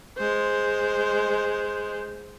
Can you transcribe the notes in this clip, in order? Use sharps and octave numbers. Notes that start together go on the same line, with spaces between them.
G#3 C5